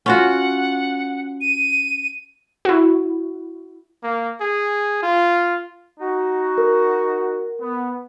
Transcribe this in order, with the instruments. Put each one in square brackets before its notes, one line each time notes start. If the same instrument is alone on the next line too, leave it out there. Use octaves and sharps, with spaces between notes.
[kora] C#4 F4 F#4 [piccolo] F#5
[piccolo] D#7
[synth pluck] E4 F#4
[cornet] A#3
G#4
F4
[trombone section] D#4 F#4
[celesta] A#4
[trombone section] B3